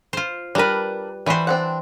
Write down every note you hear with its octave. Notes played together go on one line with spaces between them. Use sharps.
F4 C5
G3 D4 A#4 B4
E3 G3 F#4 C5 B5
C4 D4 F#5